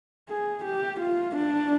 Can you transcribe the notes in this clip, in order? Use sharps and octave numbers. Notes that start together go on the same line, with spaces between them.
G#4
G4
F4
D4